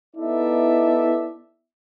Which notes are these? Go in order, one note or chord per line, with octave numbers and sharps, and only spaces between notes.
B3 D#4 E4 A4 D5 E5